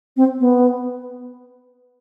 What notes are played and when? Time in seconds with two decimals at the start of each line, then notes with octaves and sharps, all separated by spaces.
0.17 C4
0.40 B3